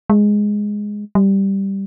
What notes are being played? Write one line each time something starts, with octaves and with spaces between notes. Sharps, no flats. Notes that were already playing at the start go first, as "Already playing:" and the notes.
G#3
G3